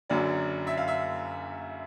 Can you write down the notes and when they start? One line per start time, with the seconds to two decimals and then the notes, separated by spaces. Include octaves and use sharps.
0.10 F#1 F#2 D3 F#3 D5
0.67 E5
0.77 F5
0.88 E5